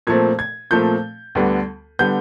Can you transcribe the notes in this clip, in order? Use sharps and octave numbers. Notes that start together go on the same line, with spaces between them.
A#2 F3 A3 C4 G#6
G#6
A#2 F3 A3 C4 G6
D2 D3 G3 B3
D3 G3 B3 G6